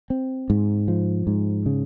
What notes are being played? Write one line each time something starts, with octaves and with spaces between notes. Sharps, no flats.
C4
G#2
F3
G#2
C#3